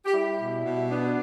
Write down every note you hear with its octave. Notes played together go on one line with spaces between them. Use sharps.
G4
G3 E4
B2
B2
B3 D4